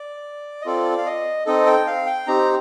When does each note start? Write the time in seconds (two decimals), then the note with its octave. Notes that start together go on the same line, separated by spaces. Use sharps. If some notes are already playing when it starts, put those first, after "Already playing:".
Already playing: D5
0.62 D#5
0.66 C4 F4 A4 D5
0.98 F5
1.06 D#5
1.46 C4 D#4 A4 D#5
1.66 G5
1.87 F5
2.06 G5
2.27 C4 D#4 G4 A#5